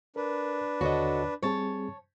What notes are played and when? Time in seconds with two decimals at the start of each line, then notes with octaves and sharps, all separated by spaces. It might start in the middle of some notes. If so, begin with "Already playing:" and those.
0.16 D4 A#4 B4
0.81 D#2 D3 F#4 A4 C#5 D#5
1.43 G3 C4 G#4 C#5 A5